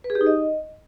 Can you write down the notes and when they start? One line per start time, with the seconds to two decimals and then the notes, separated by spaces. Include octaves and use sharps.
0.04 B4
0.10 G#4
0.15 G4
0.21 D#4
0.26 D#5